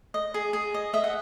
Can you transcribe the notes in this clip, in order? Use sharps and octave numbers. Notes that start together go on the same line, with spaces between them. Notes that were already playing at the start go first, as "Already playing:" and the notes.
D#5
G#4
G#4
D#5
D#5 E5
F#5